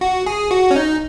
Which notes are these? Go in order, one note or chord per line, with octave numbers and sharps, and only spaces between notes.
F#4
G#4
F#4
C#4
D#4